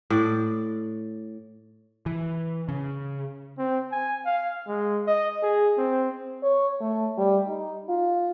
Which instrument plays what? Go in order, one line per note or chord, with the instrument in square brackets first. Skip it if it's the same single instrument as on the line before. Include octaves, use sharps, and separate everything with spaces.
[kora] A2 D5
[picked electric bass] E3
C#3
[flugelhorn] C4
G#5
F5
G#3
D#5
G#4
C4
[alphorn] C#5
A3
G3
D#4
F4